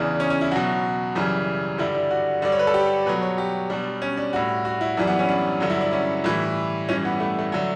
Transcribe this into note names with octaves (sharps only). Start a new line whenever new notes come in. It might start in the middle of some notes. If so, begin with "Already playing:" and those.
Already playing: E2 C#3 E3 D4
C#4
C#4
E4
B2 F#3 F#4
F#2 C#3 E3 G3
G2 D3 G3 E4
D4
F#4
G2 D3 G3 D5
C#5
B4
A4
G4
B2 F#3 B4
C#5
G4
B2 G3 D4
C#4
D4
A2 G3 F#4
F#4
E4
F#2 E3 G3 D4
B3
C#4
D4
G2 D3 F#3
E4
D4
C#4
A2 E3 G3 E4
G2 E3 G3 C#4
B3
A3
A3
D3 F#3